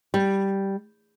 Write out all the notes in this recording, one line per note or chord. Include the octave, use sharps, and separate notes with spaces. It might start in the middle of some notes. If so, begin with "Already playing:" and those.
G3